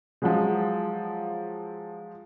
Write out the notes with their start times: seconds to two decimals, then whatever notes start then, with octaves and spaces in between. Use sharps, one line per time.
0.22 F3 F#3 G#3